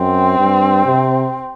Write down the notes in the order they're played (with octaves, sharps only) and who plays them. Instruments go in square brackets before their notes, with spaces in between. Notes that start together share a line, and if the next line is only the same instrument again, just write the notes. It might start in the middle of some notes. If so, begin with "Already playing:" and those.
Already playing: [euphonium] F#2 [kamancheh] C4
[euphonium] G2
C3